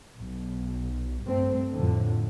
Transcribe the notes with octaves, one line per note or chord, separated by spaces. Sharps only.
B1
G2 A3 C4
F2 A2 D3